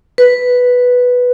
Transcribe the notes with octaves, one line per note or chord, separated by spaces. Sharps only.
B4